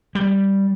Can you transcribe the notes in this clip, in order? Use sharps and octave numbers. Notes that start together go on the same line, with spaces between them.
G3